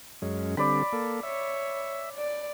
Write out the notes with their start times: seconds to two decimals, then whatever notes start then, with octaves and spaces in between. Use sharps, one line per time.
0.22 F#2 G#3 C#4
0.57 D3 G3 C4 D5 B5
0.93 A#3 A4
1.23 C#5 E5
2.17 D5